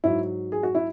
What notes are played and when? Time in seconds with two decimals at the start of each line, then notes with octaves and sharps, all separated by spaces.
0.04 G#2 F#3 E4
0.52 G#4
0.63 F#4
0.75 E4